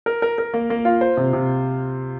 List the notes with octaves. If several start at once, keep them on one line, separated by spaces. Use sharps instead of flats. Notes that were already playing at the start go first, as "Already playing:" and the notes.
A#4
A#4
A#4
A#3
A#3
F4
C5
C3
C3